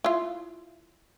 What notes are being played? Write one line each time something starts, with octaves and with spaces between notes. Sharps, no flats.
E4 F4